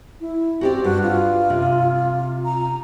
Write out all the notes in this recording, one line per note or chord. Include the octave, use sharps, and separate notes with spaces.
E4
C4 F#4 G4 D5
G2 F#4
F4
C3
A#5